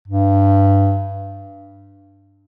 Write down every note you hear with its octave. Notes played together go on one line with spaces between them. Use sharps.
G2